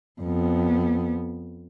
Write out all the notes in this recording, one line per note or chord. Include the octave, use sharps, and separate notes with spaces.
F2 B3